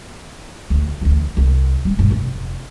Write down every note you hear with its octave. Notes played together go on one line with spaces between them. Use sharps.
D2
D2 E3
C2
G3
G2 B2
F1